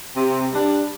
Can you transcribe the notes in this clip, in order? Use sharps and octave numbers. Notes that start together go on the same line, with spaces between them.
C3
G3 D4